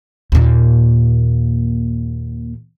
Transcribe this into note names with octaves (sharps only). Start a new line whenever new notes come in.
D#2 A#2